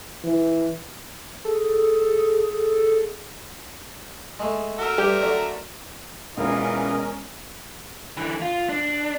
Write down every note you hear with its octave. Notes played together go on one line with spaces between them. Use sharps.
E3
G#4 A4
G#3 A3
A3 F#4 A#4 E5
G2 G4
D3 F#3
E1 E3 C#4 F4 A#4 D#5
D3 E3
F4
D4